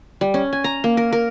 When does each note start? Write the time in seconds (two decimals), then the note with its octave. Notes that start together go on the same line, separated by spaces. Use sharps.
0.21 G3
0.34 C#4
0.53 G#5
0.64 A#5
0.84 A#3
0.97 A#4
1.13 A#4